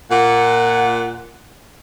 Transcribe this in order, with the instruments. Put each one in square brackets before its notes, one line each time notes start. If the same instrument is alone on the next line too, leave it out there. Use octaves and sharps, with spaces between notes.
[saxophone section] A#2 F#5